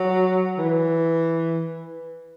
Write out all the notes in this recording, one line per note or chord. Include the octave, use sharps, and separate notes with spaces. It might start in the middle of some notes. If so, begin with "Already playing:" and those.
Already playing: F#3
E3